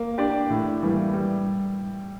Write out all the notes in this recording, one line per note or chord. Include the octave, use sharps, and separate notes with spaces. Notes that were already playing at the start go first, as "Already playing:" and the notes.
Already playing: A#3
D4 G4 D5
A2
E3 G3 A#3
G3